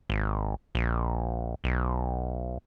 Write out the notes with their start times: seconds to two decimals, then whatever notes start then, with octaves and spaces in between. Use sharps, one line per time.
0.10 G#1
0.75 A#1
1.64 B1